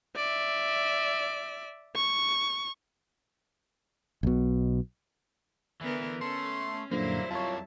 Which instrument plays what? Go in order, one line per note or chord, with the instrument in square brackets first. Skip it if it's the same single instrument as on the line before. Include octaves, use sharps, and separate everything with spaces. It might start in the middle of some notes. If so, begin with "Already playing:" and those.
[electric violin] D5 E5
C#6
[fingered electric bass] B1 B2
[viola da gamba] D3 B3 A#4 [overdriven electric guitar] E3
[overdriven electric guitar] A3 [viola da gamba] C#4 [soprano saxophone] C6
[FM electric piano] F#2 A#2 D3 [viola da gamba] F#3 G3 E4 [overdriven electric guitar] A#3 [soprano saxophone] C5
[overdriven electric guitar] F2 A#3 [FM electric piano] F4 C#5 [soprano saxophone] A5